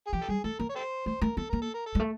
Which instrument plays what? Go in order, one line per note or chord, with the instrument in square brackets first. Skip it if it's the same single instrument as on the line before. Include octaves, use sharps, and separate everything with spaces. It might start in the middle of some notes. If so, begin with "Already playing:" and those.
[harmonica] G#4
[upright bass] F3 [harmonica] G4
[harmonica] A4
[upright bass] G3 [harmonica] G#4
[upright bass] A3 [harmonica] A4
[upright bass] A#3 [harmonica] A#4
[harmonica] C#5
G4 A4 C5
[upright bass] A3 [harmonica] C5
[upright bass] A3 [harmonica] A#4
[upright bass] B3 [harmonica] A4
[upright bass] A#3 [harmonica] A#4
[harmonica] A4
A#4
A4
[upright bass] G#3
A3